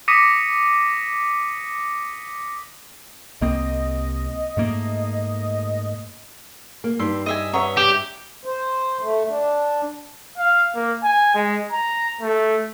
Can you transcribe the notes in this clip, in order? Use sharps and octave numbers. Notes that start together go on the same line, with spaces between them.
D6 D#6 A#6 B6 C#7 D#7
C2 A#3 C4 D#5
G#2 A3 A#3
A#3
G2 D#4 C6 E6
D#5 E5 G#5
B4 C#5 D#5 E5 F#5 A#5
G4 D7 E7
C5
A3
D4
F5
A#3
G#5
G#3
A#5
A3